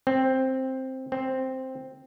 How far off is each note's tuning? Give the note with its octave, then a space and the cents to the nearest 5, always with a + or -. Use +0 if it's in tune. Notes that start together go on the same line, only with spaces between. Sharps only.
C4 +5
C4 +0